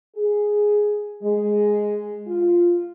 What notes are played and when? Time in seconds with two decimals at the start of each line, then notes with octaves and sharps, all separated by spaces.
0.16 G#4
1.22 G#3
2.25 F4